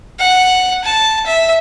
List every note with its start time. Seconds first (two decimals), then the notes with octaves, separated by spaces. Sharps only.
0.19 F#5
0.85 A5
1.27 E5